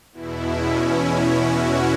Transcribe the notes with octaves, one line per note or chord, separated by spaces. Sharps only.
E2 B2 E4
C#4
F#4